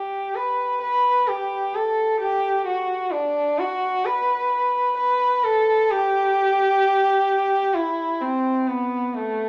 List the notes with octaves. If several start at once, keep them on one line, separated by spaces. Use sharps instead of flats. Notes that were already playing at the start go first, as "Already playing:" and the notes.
Already playing: G4
B4
B4
G4
A4
G4
F#4
D4
F#4
B4
B4
A4
G4
E4
C4
B3
A3